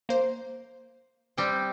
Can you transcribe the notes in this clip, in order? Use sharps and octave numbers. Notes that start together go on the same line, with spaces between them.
A#3 C5
G3 C4 G5